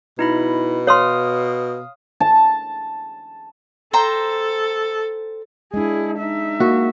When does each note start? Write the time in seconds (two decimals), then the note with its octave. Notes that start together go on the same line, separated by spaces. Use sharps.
0.19 B2 D#4 E4 B5
0.87 C#5 F5 C6 D#6 F6
2.20 A5
3.93 A4 C5 G5 A#5
5.74 G#3 D4 E4 G#4
6.18 D#4 E5
6.60 A#3 F#4